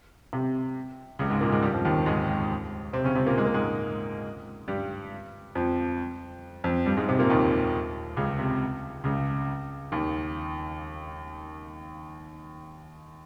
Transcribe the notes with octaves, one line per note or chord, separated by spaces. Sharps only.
C3
C#2 C#3
G#2 G#3
A#2 A#3
G#2 G#3
G2 G3
F2 F3
D#2 D#3
G#2 G#3
C3 C4
C#3 C#4
C3 C4
A#2 A#3
G#3
A#3
G#2 G#3
G2 G3
F2 F3
F2 F3
G2 G3
G#2 G#3
C3 C4
A#2 A#3
D#2 D#3
C#2 C#3
C3
C#2 C#3
D#2 D#3